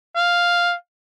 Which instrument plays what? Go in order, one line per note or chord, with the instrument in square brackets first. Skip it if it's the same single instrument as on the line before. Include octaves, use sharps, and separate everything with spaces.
[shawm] F5